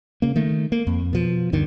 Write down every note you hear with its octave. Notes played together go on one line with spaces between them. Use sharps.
C#3 A#3
D#3 A3
A#3
F2
B2 F3
D2 G2 D3 D#3